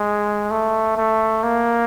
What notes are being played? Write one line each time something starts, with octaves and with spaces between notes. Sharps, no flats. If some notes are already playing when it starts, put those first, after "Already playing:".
Already playing: G#3
A3
A3
A#3